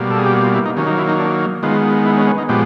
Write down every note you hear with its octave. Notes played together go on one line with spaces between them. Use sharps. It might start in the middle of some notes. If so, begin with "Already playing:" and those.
Already playing: B2 G3 A#3
A4
G#4
G4
F#4
F4
E4
D#4
D#3 F#3 A#3 C#4
D#4
E4
D#4
D4
D#3 G#3 B3 F4
E4
C#4
C#4
D#4
A#2 F3 G#3 B3 G4